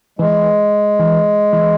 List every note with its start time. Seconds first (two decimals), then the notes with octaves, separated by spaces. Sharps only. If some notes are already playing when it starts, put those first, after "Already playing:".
0.19 E3 G#3
0.99 E3
1.53 E3